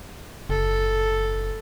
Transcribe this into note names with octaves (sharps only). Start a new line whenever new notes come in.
F#1 A4